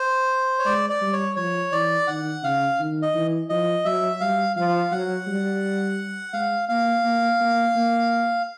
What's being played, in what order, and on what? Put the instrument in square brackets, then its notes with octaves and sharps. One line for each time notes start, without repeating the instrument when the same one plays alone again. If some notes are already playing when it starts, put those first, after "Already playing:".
Already playing: [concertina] C5
C#5
[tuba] G#3 [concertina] D5
[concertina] D5
[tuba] G3
[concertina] C#5
[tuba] F3 [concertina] C#5
[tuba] E3 [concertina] D5
[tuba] D#3 [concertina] F#5
[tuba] C#3 [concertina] F5
[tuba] D#3
[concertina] D#5
[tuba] E3
[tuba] F3 [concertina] D#5
[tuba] F#3 [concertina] E5
[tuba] G3 [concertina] F5
[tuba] F3 [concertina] F5
[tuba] F#3 [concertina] F#5
[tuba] G3
[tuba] G#3 [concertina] F5
[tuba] A#3 [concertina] F5
[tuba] A#3
A#3
A#3